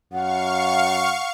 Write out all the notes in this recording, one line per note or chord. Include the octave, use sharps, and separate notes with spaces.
F#2 F5 F#5 C#6